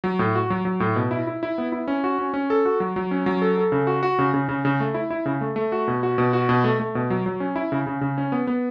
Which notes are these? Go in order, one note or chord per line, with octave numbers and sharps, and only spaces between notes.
F#3
A2
F#4
F#3
F#3
A2
B2
E4
E4
E4
B3
E4
C#4
F#4
C#4
C#4
A4
F#4
F#3
F#3
C#4
F#3
A4
A4
C#3
F#4
F#4
C#3
C#3
C#3
C#3
A3
E4
E4
C#3
A3
A3
F#4
B2
F#4
B2
F#4
B2
A3
A3
B2
F#3
F#3
C#4
E4
C#3
C#3
C#3
C#4
B3
B3